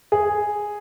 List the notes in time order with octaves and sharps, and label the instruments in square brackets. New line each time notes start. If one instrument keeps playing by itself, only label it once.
[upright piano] G#4